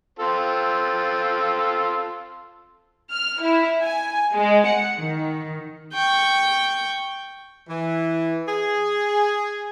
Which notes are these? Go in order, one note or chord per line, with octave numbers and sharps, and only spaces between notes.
C4 F4 A4
F6
E4
G#5
G#3
F#5
D#3
G5 C#6
E3
G#4